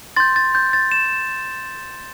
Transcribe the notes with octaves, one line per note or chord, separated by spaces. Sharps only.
C6 G6 A6
A6
G6
A6
E7